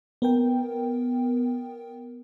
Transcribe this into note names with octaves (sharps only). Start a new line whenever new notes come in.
B3 A#4 G5